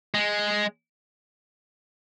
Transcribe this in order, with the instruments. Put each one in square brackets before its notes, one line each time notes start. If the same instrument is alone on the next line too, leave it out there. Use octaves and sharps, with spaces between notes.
[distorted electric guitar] G#3